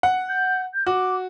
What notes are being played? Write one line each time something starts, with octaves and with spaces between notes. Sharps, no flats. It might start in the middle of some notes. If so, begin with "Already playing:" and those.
F#5
G6
G6
F#4 D6